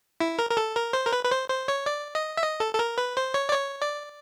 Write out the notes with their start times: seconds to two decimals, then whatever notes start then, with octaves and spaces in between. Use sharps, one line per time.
0.20 E4
0.39 A#4
0.51 A#4
0.57 A4
0.76 A#4
0.93 C5
1.06 A#4
1.13 B4
1.25 B4
1.31 C5
1.49 C5
1.68 C#5
1.86 D5
2.15 D#5
2.37 E5
2.42 D#5
2.60 A4
2.75 A4
2.79 A#4
2.98 B4
3.17 C5
3.34 C#5
3.49 D5
3.53 C#5
3.82 D5